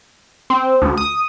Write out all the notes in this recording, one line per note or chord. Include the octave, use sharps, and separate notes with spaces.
C4
D2
D#6